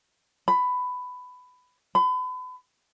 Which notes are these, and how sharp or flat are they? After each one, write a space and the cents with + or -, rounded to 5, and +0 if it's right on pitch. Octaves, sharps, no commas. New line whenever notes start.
B5 +15
B5 +35